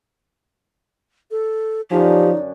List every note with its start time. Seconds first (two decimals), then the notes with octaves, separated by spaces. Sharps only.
1.31 A4
1.91 F#2 D3 F3 D#4 G4 G#5